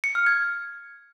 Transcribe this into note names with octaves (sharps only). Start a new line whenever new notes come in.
C#7
F6
G#6